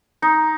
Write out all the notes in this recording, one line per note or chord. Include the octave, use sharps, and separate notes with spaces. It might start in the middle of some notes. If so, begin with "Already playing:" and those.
D#4